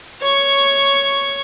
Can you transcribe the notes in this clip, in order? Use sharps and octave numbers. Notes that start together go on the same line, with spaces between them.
C#5 C#6